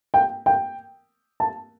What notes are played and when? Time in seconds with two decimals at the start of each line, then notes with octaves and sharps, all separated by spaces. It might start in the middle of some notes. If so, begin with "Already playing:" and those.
0.14 G5
0.46 G5
1.40 A5